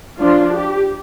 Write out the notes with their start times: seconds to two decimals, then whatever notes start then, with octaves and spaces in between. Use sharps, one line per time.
0.20 F3 D4 F4
0.55 G4